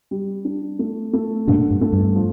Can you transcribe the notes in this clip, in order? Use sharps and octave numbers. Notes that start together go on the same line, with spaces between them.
G3
D4
A3
A3
G2 A#2 D3
G2
A3
G2
F3